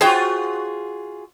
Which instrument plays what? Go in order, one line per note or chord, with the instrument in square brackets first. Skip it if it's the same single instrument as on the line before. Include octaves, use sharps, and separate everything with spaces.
[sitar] F4 F#4 G#4 [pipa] C5 C#5 G5